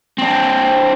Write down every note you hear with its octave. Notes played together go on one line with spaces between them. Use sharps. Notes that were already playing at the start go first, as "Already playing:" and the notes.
C4 D4